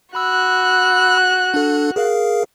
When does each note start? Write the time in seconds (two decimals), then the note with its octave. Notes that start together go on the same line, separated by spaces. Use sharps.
0.15 F#4 B5 E6 F#6
1.54 D4 A4
1.96 G#4 A#4 F5